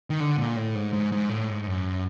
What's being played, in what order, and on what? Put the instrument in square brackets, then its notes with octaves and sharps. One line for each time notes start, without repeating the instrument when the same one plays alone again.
[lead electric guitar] D#3
D3
A#2
A2
G#2
G#2
G#2
A2
G#2
F#2